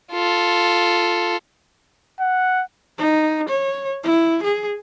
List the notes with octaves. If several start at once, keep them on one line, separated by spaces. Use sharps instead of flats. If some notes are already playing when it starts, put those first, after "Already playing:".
F4 A4
F#5
D#4
C#5
E4
G#4